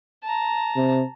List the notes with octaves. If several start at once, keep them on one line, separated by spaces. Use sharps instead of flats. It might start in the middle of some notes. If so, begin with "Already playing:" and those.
A5 A#5
C3